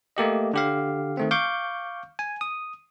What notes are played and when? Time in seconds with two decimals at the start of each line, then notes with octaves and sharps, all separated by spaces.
0.17 A3 A#3 G4 D#5
0.54 D3 G4 F5
1.17 D#3 A3 C4
1.31 F5 C#6 D6 G6
2.19 G#5
2.41 D#6